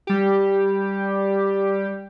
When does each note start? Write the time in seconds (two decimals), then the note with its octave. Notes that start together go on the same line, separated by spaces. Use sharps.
0.07 G3 G4